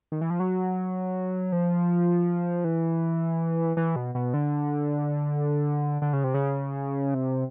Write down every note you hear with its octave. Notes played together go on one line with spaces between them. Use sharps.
D#3
E3
F3
F#3
F3
E3
E3
B2
B2
D3
D3
C#3
C3
C#3
C3